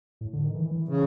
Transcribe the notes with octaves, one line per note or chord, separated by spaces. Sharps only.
A2
D3
D#3
E3
E3
C#3